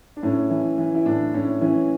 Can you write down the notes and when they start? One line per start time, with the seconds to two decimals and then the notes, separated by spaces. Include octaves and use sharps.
0.16 D4
0.23 A2 C#4
0.50 E3
0.78 E3
0.95 E4
1.06 A2 D4
1.34 A2 C#4
1.61 E3 C#4